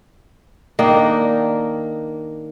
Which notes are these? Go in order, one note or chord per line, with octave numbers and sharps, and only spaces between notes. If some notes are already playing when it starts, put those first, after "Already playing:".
D#3 A#3 D4 D#4